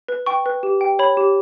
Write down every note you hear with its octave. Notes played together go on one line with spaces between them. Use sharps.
B4
G5 C#6
B4
G4
G5
C#5 B5
G4